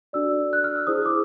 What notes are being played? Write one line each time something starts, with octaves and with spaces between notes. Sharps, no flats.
D4 F#4 A4 D5 E6
F#6
F6
E6
E4 G#4 C5 D#6
D6